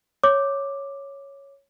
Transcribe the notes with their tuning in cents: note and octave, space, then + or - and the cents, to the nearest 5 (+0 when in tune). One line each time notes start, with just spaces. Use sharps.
C#5 +0 D6 +5